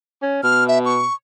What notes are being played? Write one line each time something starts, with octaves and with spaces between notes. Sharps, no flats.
C#4
B2 F6
E5
C#6